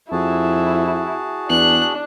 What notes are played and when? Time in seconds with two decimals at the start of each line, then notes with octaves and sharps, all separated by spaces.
0.12 F2 E4 F#4 G#4 A5
1.49 E2 D4 F#6